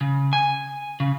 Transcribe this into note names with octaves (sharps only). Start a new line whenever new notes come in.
C#3
G#5
C#3